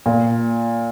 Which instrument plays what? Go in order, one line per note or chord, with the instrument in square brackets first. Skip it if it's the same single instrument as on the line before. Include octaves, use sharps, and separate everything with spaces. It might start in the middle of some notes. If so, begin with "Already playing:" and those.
[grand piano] A#2